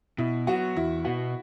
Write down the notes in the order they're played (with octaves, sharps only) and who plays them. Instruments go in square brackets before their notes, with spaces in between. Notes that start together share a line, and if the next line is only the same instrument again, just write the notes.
[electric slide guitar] B2 [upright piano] E4
[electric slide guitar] F#3 B3 [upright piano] F#4
[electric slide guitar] E2 [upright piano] E4
[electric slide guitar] B2 B3 [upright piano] F#4